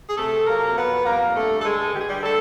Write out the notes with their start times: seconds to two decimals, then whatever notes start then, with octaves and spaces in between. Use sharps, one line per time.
0.09 G#4
0.17 C3 A3 A4
0.47 F#3 A#3 A#4
0.76 F2 B3 B4
1.05 G3 A#3 A#4
1.34 D3 A3 A4
1.59 A4
1.64 G2 G#3 G#4
1.94 D3 G4
2.01 G#4
2.09 G3 G4
2.23 D3 A3 A4